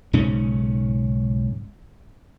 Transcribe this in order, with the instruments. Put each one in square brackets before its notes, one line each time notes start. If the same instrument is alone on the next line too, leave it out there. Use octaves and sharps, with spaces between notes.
[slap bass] B1 G#2 C#3 C#4